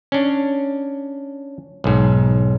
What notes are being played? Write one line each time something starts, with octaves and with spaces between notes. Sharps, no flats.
C#4 D4
B1 G#2